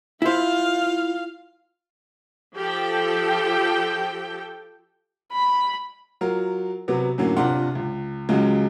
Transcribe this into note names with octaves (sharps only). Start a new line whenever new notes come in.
E4 F4 C5 F5
F3 G4 A4 G5
B5
F#3 F4 A#4
C3 F#3 B3
F#2 A2 D3 F#3 A#3
G1 C3 D4 F4 F#5 C6
C#2
C#2 C#3 F#3 G#3